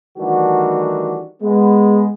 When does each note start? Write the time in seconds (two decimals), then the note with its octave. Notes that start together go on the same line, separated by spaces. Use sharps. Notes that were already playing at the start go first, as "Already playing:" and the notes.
0.17 D#3 E3 G3 A3 D4 F#4
1.42 G#3 B3